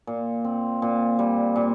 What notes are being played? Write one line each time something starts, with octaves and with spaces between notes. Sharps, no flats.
A#2
C4
A#2
G3
A#2